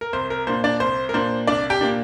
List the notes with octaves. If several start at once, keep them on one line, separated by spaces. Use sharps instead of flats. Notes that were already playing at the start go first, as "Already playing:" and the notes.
A#4
C2 C5
A#4
A#2 A#3 D4 C5
D4 D5
C2 C5
A#4
A#2 A#3 D4 C5
C2 D4 D5
G4 G5
A#2 A#3 D4